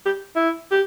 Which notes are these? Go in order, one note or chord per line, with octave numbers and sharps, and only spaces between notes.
G4
E4
G4